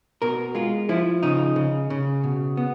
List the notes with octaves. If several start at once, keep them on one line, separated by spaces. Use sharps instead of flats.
B2 A#4
G#3 F4
F3 E4
C#3 D#4
C#3
C#3
B2
B3